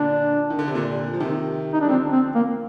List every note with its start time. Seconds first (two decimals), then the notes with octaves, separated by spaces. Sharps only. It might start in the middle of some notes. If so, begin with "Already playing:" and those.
Already playing: A#2 D3 D4
0.50 D#3
0.59 D3
0.68 C3
0.75 A#2 D3
1.13 F3
1.20 C3 D#3
1.73 D#4
1.81 D4
1.84 G3
1.88 D3 F3 C4
2.12 C4
2.35 A#3